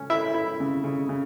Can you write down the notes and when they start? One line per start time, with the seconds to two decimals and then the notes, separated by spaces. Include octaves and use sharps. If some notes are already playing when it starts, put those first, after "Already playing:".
Already playing: C#3 C#4
0.10 E4 E5
0.34 E4
0.60 C#3
0.84 C#3
1.09 C#3